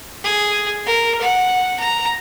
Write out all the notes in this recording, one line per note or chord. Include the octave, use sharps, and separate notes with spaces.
G#4
A#4
F#5
A#5